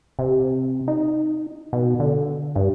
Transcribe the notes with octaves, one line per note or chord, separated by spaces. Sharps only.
C3
D#4
B2
D3
G2